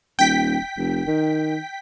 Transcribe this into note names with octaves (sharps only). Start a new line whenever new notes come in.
D#1 G5 B6
F1
D#3